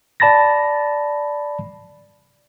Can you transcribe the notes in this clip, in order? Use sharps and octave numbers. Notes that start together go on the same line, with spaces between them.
D5 A5 B5 A6 A#6